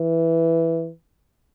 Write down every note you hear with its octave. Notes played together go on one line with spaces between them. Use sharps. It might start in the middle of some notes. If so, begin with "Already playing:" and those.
Already playing: E3